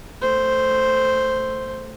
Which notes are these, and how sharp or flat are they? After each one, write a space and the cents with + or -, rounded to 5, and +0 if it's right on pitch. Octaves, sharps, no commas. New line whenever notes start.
A3 +0 C5 +0